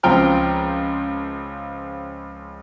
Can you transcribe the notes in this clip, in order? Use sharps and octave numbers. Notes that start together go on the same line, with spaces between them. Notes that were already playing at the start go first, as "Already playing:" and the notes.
C#2 F3 C4 G5 A#5 F6